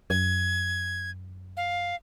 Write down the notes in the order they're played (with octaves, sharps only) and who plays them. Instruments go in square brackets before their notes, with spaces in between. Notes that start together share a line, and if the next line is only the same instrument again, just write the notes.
[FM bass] F#2 [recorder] G#6
[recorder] F5